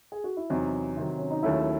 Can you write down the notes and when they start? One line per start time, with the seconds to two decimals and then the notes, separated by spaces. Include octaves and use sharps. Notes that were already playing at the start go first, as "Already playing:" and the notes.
0.12 G#4
0.24 F#4
0.37 E4
0.50 E2 C3 F#3 C4 D#4
0.97 C3 D#3 F#3
1.18 C#4
1.30 D#4
1.43 D#2 D#3 F#3 A3 C#4 E4